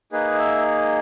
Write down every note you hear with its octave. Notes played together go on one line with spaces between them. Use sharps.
A#3 D#4 G#4 B4
E5